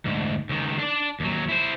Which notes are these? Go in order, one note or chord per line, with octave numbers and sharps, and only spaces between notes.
D2 G#2
C#2 D#3
D4 D5
D#2 F#3
E4 C5